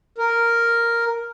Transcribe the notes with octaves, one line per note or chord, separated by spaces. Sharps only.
A#4